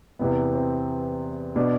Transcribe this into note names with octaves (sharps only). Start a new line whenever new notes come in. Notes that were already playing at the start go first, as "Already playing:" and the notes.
E2 C3 E3 B3
C4
B2 D4